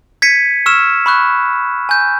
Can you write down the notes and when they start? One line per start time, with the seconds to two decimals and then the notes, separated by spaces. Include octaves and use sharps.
0.22 G#6 B6 C#7 D#7
0.66 C#6 E6 F6 E7
1.06 B5 C#6 F#6
1.89 G#5 G6